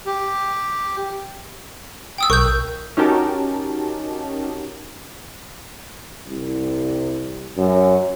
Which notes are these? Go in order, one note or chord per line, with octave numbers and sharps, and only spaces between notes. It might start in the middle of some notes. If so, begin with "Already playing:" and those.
G4
G5 D#6 E6
B1 A#4 C#6 F#6 G6
C#4 D#4 F#4 G4 A#4 A5
C2
F#2